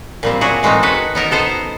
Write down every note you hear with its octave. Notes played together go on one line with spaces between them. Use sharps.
A#2 G3 C4
F#3 E4 F#4 G#4
E3 G#3 A3 C4 D#4
F#4 A4 B4
B3 D#4 A#4 A5
B3 A4 C5 D#5